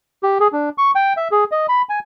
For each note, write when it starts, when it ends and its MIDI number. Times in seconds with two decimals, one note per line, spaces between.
0.23 0.38 67
0.40 0.48 68
0.52 0.69 62
0.78 0.91 85
0.95 1.13 79
1.17 1.28 76
1.31 1.44 68
1.51 1.66 75
1.69 1.82 83
1.89 1.99 80